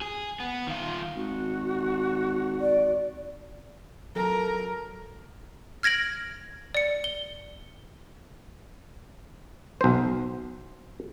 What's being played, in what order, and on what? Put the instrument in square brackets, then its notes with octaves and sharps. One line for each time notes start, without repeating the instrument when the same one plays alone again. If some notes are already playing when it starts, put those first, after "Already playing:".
[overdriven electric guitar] G#4
B3
D#3 F4
[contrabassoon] G#1 [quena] F#4
[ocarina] D5
[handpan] F#3 A4 [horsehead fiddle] A#4
[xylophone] F6 G#6 A#6 D7 F#7
D5 C#7
G7
[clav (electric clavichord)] B1 C5